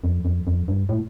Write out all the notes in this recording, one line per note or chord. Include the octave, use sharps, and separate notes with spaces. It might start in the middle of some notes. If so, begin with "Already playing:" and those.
F2
F2
F2
G2
A2